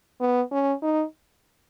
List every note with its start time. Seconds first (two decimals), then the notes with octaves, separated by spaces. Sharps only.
0.20 B3
0.51 C#4
0.82 D#4